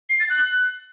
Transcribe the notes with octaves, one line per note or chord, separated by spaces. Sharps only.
C7
A6
F#6